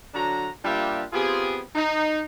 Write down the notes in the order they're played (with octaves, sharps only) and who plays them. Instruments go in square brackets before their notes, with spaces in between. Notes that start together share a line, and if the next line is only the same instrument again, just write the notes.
[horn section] D3 F#3 D4 F#4 A#5
G3 A#3 D4 F4 G4 E5
B3 C4 F4 G4 G#4
D#4